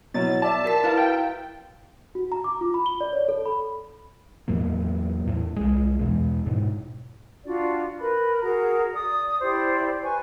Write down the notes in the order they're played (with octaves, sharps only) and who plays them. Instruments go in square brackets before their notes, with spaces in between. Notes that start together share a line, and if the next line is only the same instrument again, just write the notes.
[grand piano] B2 F#3 E4 [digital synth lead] A6
[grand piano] D5 E5 [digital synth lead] A5
[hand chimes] F#4 A#4 B6
E4 B4 F5
[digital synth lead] G5
[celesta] F#4
A#5
D6
F4
B5
G7
D5
C#5
A4
B5
[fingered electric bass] E2 A2 F#3 A#3
E2 A2
C2 G#3
E2 B2 G#3
G#2 B2
[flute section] D4 F4 F#4 D5
A#4 B4 B5
F#4 G#4 A#4 A#5
D5 D#6
E4 G4 C5 D5
B4 G#5 C#6